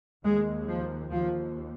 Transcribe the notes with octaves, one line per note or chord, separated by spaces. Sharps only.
D#2 G#3
F3
D#2 F3